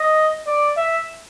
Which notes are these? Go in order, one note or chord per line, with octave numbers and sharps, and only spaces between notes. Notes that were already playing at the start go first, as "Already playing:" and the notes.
Already playing: D#5
D5
E5